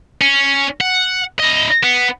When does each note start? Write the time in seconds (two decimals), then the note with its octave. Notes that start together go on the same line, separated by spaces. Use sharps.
0.21 C#4
0.81 F#5
1.39 E4 D#5
1.83 B3